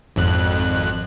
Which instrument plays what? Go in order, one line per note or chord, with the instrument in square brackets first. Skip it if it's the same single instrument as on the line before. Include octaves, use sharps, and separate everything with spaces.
[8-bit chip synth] G#1 F2 F#6